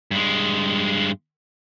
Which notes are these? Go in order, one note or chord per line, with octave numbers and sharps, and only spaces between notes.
G2 G#3